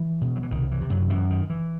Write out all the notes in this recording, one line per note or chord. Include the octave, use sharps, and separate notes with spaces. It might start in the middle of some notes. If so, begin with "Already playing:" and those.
Already playing: E3
B2
F#3
E3
C2 D#3
E3
C3
F#2 F#3
F#2 E3
D#3
E3